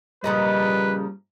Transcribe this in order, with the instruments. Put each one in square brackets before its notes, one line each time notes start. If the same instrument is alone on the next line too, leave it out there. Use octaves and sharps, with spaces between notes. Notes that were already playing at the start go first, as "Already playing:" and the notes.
[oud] A#2 C#3 F3 [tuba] G3 [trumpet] B4 [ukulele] D#5